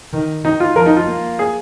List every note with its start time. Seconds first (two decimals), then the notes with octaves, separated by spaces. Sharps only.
0.13 D#3
0.44 D#3 D#4
0.60 F4
0.76 F3 A#4
0.86 D#4
0.96 F4
1.07 A#3
1.39 G#4